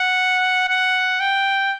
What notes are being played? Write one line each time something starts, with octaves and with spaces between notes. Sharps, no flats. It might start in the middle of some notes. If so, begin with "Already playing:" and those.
Already playing: F#5
F#5
G5